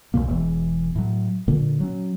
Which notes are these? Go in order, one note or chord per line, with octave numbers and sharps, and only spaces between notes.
B1 F#2 B2 A#3
E1 E2 E3
A2 F#3
A#2 D3
F#3 C#4